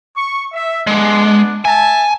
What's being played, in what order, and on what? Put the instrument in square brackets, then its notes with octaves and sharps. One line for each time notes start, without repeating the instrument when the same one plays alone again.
[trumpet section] C#6
E5
[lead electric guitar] G#3 [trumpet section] B3 D4
[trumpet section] E5 A5 [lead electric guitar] G#5